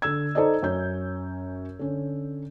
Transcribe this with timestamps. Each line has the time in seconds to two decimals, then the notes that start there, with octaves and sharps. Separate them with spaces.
0.02 D3 E6 G#6
0.35 D#4 A4 C5 D5 D#5
0.62 F#2 C#4 G6
1.79 D3 C#4